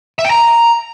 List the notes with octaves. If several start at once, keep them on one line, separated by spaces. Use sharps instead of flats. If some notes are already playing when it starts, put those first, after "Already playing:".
E5
G5
A#5